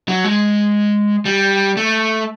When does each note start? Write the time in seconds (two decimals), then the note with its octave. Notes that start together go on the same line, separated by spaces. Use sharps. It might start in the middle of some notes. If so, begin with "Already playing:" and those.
0.08 F#3
0.24 G#3
1.25 G3
1.77 A3